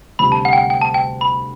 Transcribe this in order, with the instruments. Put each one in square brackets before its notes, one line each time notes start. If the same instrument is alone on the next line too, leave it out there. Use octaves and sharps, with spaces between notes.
[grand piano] D2 C3 G3 [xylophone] B5
[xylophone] A5
F#5
G5
F#5
G5
A5
G5
B5